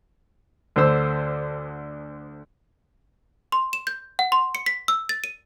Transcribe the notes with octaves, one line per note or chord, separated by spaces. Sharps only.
D2 D3 C5 E6
C6
E7
G6
F#5
C6
C#7
B6
E6
A6
D#7